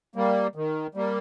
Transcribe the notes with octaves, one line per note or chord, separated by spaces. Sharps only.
G3 A#3
D#3
G3 A#3